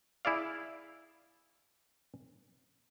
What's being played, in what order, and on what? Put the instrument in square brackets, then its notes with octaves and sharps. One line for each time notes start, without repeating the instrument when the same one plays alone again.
[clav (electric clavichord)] E4 G#4 D5 F5